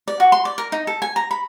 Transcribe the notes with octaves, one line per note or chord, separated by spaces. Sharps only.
D5
F#4
C6
D5
A#4
D#4
A4
G#5
A#5
B5